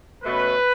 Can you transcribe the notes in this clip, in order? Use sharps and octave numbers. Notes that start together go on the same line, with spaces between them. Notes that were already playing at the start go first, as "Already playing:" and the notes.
B2 A3 C#4 B4